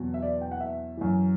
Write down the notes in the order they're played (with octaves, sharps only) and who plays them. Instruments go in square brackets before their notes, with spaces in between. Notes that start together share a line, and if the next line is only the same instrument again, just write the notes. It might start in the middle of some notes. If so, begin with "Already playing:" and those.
Already playing: [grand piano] E2 B2 F#3
E5
D5
G5
F#5
E5
F#2 E3